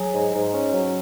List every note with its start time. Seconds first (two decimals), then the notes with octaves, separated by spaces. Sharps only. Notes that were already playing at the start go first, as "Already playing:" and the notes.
Already playing: F#3 G#4
0.13 G#2
0.33 G#2
0.53 C#4
0.74 F#3